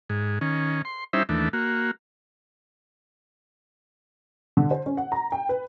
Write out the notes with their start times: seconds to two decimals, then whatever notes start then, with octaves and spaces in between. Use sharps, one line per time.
0.10 G#2
0.41 D#3 C#4
0.85 C6
1.13 G3 C#4 D#4 E4 C5 E5
1.29 D#2 E3 A3 D4
1.53 A#3 F#4
4.57 D3
4.71 C5
4.86 C#4
4.97 F#5
5.12 A#5
5.32 G5
5.49 B4